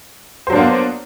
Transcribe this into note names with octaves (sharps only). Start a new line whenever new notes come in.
F#3 A#3 B3 D4 C5